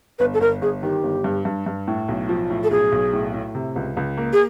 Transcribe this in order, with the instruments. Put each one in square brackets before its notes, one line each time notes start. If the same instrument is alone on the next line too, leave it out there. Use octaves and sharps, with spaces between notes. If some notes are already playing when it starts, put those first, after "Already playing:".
[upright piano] G1 [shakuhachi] B4
[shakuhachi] A4
[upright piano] G1 [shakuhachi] A#4
[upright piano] G1 [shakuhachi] G#4
[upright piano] D#3 [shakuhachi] G4
[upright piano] G1
G2
G2
G2
A2
B1
F3
A2
[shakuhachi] A4
[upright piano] B1 [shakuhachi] G#4
[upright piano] B1
A2
A2
C3
C#2
C#2
A#3
[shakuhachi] G#4